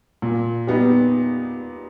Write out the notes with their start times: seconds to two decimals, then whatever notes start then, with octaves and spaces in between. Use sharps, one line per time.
0.22 A#2
0.67 G3 B3 D#4